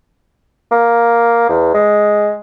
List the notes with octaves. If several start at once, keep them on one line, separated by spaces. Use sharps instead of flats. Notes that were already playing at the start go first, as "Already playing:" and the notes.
A#3
E2
G#3